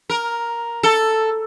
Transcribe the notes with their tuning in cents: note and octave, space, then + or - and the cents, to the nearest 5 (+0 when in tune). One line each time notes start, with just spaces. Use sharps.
A#4 +5
A4 +5